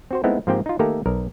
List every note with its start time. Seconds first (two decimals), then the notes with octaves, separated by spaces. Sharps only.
0.11 C4 F#4 C5
0.24 G#3 A3 B3 C4 D#4 E4
0.47 G#2 F3 A#3 C4 G4 G5
0.66 D#4 F4
0.79 D#3 A3 A#3 G4 A4 A#5
1.06 B1 A#4